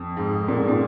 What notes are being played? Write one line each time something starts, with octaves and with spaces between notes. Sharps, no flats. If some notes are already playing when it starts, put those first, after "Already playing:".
Already playing: F2
G#2
A#2
G#2
A#2